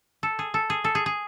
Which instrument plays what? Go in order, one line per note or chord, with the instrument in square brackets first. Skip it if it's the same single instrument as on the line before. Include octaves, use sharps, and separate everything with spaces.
[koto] A4
G#4
A4
G#4
A4
G#4
G#4